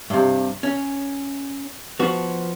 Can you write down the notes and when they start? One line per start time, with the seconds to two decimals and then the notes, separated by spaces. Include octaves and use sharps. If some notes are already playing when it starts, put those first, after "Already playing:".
0.10 G2 C3
0.63 C#4
1.99 F3 B3 F#4